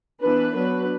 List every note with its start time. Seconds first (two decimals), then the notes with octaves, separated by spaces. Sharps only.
0.22 E3 B3 D4 B4
0.55 F#3 B3 D4 B4